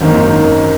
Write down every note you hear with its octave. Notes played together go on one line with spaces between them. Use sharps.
G#1 F#2 D#3 A#3